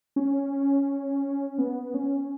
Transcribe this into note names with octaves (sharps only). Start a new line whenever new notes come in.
C#4
B3
C#4